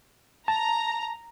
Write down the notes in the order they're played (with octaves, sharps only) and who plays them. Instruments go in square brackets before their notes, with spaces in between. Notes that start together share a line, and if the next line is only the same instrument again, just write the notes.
[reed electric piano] A5 [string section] A#5